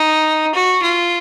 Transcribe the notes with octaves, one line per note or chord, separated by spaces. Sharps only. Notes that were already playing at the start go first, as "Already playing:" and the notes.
Already playing: D#4
F#4
F4